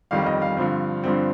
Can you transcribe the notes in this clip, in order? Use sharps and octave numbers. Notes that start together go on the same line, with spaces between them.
G1 F2 D#3 G3 F5
D#5
F5
G2 D3 F3 C4
G2 D3 F3 C4